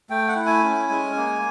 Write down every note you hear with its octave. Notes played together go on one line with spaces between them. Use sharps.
A3 G5
F#5
E4
G#5
C#4
G#3
A#3